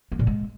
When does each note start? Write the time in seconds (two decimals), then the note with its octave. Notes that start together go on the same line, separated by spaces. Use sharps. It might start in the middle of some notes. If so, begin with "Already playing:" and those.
0.12 A#3
0.19 A#2
0.27 G#3